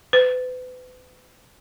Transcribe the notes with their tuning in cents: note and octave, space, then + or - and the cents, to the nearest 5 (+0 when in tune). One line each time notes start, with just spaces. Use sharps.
B4 +40